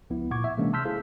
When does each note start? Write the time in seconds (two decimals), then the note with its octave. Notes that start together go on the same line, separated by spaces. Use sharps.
0.10 C#2 F3 B3 E4
0.31 A#2 F#5 C#6 D6 G#6
0.44 E5
0.57 C3 E3 G#3 A#3 C#4 D4
0.73 A5 C6 E6 F6 G6 B6
0.85 E4 G#4 A4 C5 F5